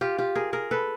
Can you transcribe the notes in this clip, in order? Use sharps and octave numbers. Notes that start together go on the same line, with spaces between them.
F4 G4
F4 G4
G#4 A#4
G#4 A#4
A4 B4